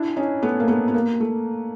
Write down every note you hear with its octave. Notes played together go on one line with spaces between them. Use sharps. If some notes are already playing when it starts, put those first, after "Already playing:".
Already playing: D4 E4
C#4 D#4
A3 B3
A#3
A3 B3
B3
A#3
A3